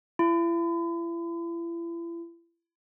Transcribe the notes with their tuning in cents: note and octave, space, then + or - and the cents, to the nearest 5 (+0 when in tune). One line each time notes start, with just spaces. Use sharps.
E4 +40